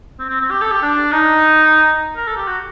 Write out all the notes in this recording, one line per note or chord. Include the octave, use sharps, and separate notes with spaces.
C4
C4
C4
G4
A4
G4
D4
D#4
A#4
A4
G4
F#4